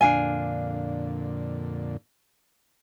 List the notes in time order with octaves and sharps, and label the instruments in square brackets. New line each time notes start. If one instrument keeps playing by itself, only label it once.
[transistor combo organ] F2 A#2 D3 [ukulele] D4 F5 G#5